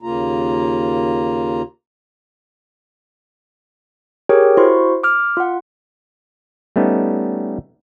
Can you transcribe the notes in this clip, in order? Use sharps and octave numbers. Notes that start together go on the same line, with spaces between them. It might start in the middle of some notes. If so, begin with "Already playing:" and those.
D#2 C#3 A#3 F4 A#5
G4 G#4 A#4 C#5 G5
E4 F#4 C5 C6 C#6
D6 F6
F4 F#5
G3 A3 B3 C#4 D#4